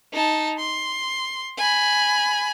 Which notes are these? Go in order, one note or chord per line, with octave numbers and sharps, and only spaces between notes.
D#4 A5
C6
G#5 B5